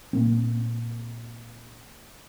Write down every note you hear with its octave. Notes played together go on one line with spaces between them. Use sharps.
A#2 A#3 C4